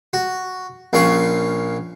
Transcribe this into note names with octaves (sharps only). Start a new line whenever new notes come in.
F#4
A#1 A#2 C#4 F5 C#6